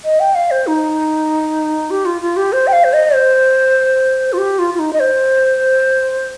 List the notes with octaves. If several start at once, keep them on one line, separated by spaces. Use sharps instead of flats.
D#5
G5
F5
C5
D#4
G4
F4
F4
G4
C5
G5
F5
C5
D#5
C5
F4
G4
F4
F4
D#4
D#5
C5